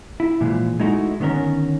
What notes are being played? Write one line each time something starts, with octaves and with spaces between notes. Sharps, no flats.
E4
A#2 E3 F3 G#3
G#3 A3 D#4 E4 F#4
D3 D#3 B3 C#4 A#4